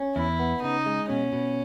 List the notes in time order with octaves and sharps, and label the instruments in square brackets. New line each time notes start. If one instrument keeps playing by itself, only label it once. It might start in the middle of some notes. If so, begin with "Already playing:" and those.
Already playing: [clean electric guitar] C#4
[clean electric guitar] E2 [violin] E4
[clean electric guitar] B3
[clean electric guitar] C#3 [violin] D#4
[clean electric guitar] G#3
[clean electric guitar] B2 [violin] C#4
[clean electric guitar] B2